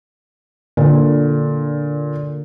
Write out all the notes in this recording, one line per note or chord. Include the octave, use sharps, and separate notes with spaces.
A#2 D3